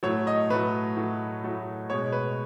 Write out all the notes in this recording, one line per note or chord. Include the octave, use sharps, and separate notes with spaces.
A2 F#3 A3 C#5
D#5
A2 F#3 A3 B4
A2 F#3 A3
A2 F#3 A3
B2 G#3 C#5
B4